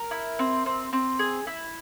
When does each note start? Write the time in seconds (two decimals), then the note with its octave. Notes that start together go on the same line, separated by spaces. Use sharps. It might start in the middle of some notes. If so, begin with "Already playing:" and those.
Already playing: A#4
0.11 E4
0.39 C4
0.66 C4
0.93 C4
1.19 G#4
1.47 E4